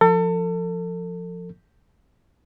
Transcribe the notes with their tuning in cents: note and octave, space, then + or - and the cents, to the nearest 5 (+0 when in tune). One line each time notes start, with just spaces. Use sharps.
F3 +0 A4 +35